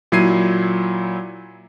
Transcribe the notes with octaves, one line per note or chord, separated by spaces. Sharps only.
A#2 F#3 E4 G#6 C7 D#7